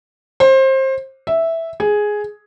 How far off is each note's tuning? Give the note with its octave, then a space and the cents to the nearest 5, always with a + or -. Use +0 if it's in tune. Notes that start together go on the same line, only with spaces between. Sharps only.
C5 +25
E5 -5
G#4 +5